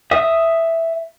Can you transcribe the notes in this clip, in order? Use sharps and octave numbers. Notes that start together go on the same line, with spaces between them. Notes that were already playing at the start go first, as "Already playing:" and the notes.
E5 D#6